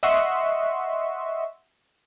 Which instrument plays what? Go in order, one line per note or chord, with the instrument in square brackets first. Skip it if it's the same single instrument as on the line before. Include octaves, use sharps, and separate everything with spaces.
[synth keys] D#5 E5 F#5 C6 C#6